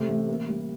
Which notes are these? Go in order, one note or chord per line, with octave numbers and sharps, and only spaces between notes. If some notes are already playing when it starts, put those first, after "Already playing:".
Already playing: C3 A3
A1
A#3
G3